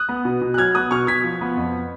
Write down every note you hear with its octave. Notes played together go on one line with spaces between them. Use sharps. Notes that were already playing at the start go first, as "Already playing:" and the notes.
Already playing: D#6 F#6
B3
B2
B2
F#6
F#3 F6 G#6
B3 D#6 F#6
B2 C#6 F6
B2 G#6 B6
F3
B3
F2